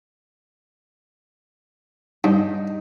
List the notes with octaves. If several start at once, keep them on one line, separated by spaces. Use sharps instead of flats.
G2 D#4